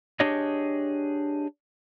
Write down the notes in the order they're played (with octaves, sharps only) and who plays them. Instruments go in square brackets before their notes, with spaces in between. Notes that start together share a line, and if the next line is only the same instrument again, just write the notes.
[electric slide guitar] D4 G4 G#4 C#5 D#5